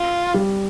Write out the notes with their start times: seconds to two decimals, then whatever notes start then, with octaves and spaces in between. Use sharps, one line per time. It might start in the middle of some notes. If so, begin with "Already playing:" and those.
Already playing: F4
0.34 G3